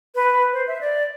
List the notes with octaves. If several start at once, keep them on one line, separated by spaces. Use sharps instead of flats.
B4
C5
E5
D5